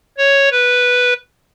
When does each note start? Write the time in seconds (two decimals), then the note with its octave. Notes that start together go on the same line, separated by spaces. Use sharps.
0.18 C#5
0.51 B4